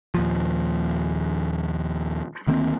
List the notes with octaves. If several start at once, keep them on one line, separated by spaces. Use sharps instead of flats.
D#2 A#2 F3
D2 D#3 A#3 C4